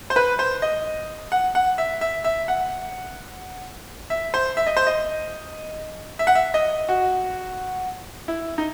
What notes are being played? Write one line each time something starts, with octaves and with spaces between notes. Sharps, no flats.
C5
B4
C5
D#5
F#5
F#5
E5
E5
E5
F#5
E5
C5
E5
D#5
C5
D#5
E5
F#5
E5
D#5
F#4
E4
D#4